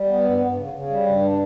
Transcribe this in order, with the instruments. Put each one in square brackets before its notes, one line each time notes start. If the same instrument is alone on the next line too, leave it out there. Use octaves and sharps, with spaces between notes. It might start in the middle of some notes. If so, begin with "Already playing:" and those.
Already playing: [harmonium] G3
B3
G2
G2
C#3
C#3
G3
G2
D4